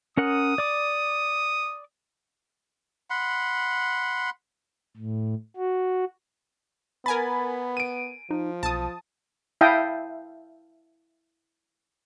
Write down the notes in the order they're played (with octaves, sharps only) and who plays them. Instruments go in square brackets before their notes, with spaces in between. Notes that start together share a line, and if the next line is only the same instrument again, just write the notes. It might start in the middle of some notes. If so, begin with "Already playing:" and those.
[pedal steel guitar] C#4 A#4 F#5 [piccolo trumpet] D#6
[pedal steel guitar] D5 D6
[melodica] F#5 B5 C6
[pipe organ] A2
F#4
[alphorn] B3 [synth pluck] A#4 G#5 A6 [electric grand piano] B5
[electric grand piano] D7 D#7
[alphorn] F3 [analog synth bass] D#4
[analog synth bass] B1 [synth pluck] A5 D#6
[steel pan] E4 E5 F5 G5 A5 D#6